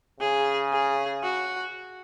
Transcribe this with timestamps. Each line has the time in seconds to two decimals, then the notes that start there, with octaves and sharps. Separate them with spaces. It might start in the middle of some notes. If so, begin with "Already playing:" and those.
0.20 C#3 G#4
0.72 G#4
1.23 F#4